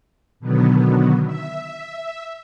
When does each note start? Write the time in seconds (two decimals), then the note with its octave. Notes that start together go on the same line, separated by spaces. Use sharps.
0.40 B2 D3 D#3 F#3 B3
1.25 E5